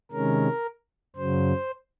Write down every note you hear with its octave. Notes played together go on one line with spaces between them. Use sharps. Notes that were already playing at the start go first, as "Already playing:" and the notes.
C3 D#3 G#3 C#4 A#4
F#2 C#3 F#3 C5